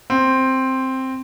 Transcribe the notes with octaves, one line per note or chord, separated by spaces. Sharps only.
C4